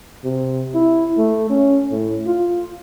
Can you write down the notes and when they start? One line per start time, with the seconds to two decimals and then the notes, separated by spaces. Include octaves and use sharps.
0.25 C3
0.74 E4
1.18 A3
1.50 C#4
1.92 A2
2.27 F4